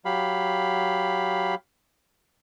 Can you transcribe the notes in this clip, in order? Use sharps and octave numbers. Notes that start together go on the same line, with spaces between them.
F#3 G4 F5 B5